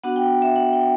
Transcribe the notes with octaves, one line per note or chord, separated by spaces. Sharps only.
B3 D4 F#4 F#5
G5
E5
F#5
G5